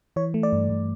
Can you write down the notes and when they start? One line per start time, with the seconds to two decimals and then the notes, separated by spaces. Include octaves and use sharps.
0.16 E3 C#5
0.34 A3
0.43 D5
0.53 G2
0.70 G2